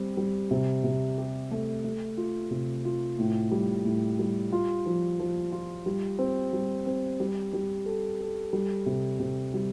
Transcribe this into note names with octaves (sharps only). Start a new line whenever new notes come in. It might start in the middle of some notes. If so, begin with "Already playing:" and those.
Already playing: G3 C4 G4
G3
C3
C3
G4
A3
A3
F4
C3
F4
A2
G3
A2
G3
F4
F3
F3
F4
G3
C4
G3
C4
G3
G3
A4
A4
G3
C3
C3
G3